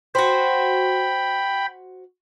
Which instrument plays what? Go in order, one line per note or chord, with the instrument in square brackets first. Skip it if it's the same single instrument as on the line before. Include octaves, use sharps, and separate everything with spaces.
[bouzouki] F#4 C5 [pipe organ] G5 B5